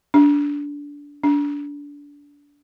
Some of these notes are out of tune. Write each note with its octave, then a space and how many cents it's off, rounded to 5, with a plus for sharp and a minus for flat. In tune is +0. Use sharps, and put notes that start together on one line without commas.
D4 -20
D4 -25